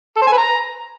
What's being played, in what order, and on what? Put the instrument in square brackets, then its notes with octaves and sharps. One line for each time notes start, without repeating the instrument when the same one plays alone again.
[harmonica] A4
C5
G#5
B4
A#5